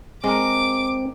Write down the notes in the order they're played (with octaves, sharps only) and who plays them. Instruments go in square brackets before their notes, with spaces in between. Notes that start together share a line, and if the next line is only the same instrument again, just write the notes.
[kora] G#3 D4 A#4 [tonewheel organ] C4 [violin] D6